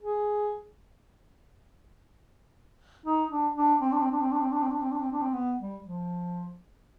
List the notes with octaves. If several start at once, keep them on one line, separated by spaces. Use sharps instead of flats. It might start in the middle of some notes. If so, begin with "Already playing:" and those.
G#4
D#4
D4
D4
C4
D4
C4
D4
C4
D4
C4
D4
C4
D4
C4
D4
C4
D4
C4
B3
G3
F3